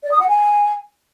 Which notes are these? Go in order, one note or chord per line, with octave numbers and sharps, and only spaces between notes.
D5
D#6
F#5
G#5